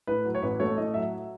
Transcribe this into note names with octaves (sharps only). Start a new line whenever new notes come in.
A2 B4
F#3
C#5
A1 B4
A3 C#5
A2 D#5
F#3 E5